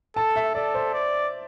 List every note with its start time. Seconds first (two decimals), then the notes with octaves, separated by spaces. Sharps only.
0.16 A4 A5
0.36 E5
0.55 A4 D5
0.74 C5
0.93 D5